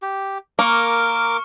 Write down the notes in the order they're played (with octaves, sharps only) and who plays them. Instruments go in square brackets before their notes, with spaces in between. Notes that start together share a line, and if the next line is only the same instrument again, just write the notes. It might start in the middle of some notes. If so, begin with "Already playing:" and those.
[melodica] G4
[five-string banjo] A#3 [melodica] A#4 D6 [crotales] C#6 F6 C#7